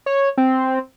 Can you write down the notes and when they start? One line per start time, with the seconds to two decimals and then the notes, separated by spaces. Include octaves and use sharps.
0.06 C#5
0.38 C4